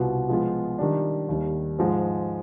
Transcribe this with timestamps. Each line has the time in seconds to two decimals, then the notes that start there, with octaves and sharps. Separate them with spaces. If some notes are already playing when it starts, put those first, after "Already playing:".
Already playing: C2 B2 B3 F4
0.29 F3 G#3 B3 F4 B4
0.79 D#3 G3 D4
1.29 D#2 D#3 G3
1.78 G#2 F3 G#3